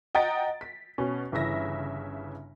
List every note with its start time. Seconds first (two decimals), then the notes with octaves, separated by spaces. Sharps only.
0.15 D#5 F#5 G5 A#5 A6 D7
0.61 B6
0.98 B2 C#4
1.32 G1 C#3 E3 E5 A#6